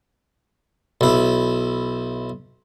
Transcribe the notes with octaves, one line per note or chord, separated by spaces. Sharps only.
B1 E4